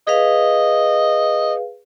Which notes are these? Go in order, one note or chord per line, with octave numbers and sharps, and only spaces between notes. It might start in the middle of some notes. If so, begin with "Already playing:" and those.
G#4 B4 D#5 F5